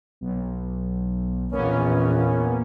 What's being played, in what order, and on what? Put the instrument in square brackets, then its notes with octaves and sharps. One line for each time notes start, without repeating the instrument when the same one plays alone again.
[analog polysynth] B1
[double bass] A#1 E2 [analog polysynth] A#3 B3 C#4